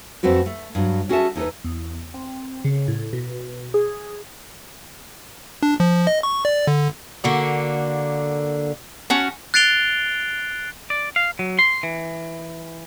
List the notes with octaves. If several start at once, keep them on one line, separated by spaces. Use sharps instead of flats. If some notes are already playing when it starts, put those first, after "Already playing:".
F2 A3 C4 F#4 B4
A3
G2 F#3
C#4 F#4 G#4 A4 E5 A5
E2 D#4 A4 B4
E2
C4
C#3
A2
B2
G#4
D4
F3
D#5
C#6
D5
D3
D3 A#3 F#4
C#4 F#4 A5
F#6 A6 C7 D7 F7 G7
D5
F5
F#3
C6
E3